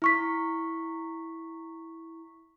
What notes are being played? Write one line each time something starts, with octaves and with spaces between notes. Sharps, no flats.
E4 C#6 B6